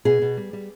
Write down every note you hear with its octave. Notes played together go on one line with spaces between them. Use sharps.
B2 G#4
B2
G3
G3